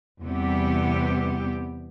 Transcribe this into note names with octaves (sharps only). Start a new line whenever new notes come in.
E2 C3 G3 B3 G4